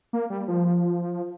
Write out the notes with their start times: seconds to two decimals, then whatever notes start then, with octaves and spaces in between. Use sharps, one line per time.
0.13 A#3
0.30 G3
0.48 F3